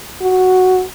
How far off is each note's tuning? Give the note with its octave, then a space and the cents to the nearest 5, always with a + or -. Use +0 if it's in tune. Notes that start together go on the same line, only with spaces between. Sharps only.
F#4 +0